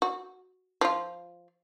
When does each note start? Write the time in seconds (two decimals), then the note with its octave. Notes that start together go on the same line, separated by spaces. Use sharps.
0.02 F#4
0.81 F3 F4